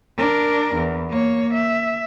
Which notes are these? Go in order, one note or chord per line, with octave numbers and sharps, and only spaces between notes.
D4 A#4
E2
A#3 C#5
E5